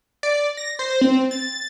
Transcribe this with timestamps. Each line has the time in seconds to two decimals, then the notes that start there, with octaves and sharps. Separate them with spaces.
0.23 D5
0.57 A#6
0.79 C5
1.01 C4
1.31 A6